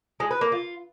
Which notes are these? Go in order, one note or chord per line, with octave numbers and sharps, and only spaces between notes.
G#3
B4
A#3
F4